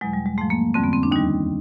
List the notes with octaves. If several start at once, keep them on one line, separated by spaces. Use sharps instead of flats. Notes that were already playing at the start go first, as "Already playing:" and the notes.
E2 B2 F#3 G#3
G3
G#3
G#2 F3 A3
A#3
F2 D3 G3 C4
B3
C4
D4
D#2 D#3 G3 D#4